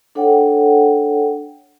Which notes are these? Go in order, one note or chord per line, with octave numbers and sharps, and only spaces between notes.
D4 A4 C#5 F#5 G5